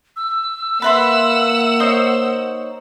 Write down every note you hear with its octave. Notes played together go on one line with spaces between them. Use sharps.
E6
A#3 B4 E5 F#5 C6 E7
D#4 C5 C#5